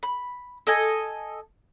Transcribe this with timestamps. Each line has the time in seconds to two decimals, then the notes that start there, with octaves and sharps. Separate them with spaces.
0.03 B5
0.67 A4 D#5 G#5